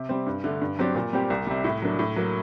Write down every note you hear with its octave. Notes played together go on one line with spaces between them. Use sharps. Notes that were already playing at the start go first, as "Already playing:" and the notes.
Already playing: C3
G3 C4
G2
D3 A3
G2
F#3 C4 G4 D5
A#2
G3 C4 G4
C2
C3 G3
A2
F#3 A#3 D4
A2
F#3 A#3